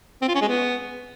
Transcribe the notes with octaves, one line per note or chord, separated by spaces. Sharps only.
C4
F4
C#4
G#3
B3